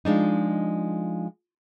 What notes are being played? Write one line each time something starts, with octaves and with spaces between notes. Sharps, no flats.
F3 G#3 D4 D#4